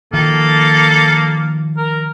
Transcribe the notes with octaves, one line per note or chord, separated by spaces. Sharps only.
D#3 F3 A#3 A4
A#4